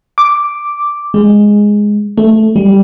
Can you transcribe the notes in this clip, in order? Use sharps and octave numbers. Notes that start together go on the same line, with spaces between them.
D6
G#3
A3
G3